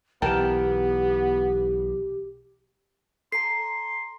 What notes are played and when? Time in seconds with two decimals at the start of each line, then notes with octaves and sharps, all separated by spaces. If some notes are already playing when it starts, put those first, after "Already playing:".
0.22 B1 E3 B3 G4 A#4 G5 A5
3.32 A4 A#5 C6 C7